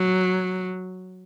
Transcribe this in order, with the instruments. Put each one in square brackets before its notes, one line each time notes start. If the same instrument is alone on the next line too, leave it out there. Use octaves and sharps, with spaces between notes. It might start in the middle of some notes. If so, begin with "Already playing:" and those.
Already playing: [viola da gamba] F#3